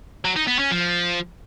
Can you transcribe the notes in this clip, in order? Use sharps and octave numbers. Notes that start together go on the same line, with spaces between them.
F#3
D#4
B3
C#4
F3